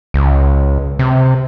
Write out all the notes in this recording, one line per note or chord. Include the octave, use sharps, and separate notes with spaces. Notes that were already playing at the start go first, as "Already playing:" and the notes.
C#2
C3